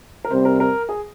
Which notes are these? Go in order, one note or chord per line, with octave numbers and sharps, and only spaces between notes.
A#4
C3 G3 C4 C5
A#4
A#4
G#4